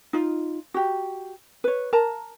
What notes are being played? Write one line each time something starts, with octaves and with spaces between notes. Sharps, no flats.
D#4 F4
F#4 G4
B4 C#5
A#4 A5 A#5